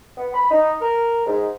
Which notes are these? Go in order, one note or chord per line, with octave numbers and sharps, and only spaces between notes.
B3
B5
D#4
A#4
G#2